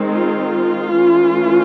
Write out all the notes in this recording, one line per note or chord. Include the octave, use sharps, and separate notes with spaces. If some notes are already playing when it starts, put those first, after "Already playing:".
Already playing: D#3 G#3 C4
F4
E3 A3 C#4